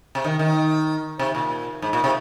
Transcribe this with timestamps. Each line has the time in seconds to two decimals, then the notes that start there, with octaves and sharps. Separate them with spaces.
0.15 C3
0.24 D#3
0.39 D#3
1.19 C3
1.35 A#2
1.82 G#2
1.93 A#2
2.04 C3